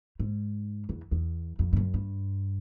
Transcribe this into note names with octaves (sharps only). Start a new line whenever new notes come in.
G#2
E2
E2
F2
G2
F#2
G2